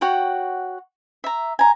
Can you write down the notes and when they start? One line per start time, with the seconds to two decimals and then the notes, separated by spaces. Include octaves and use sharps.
0.01 F#4 C#5 F#5 G5
1.24 E5 A#5
1.59 G#5 A#5